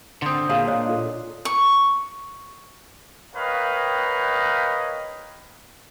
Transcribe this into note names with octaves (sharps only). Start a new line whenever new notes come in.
D3 C4 C6 D#6
A#2 G#4 C#5 F5
D4 C#5 D#5
F4 A4
C#6
A#4 B4 C#5 D#5 F5 G5